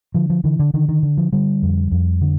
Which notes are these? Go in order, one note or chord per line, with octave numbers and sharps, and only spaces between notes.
D3 F3
F3
D3 E3
D3
D3 D#3
D#3
D3
F3
D3 G3
F2
F2
D3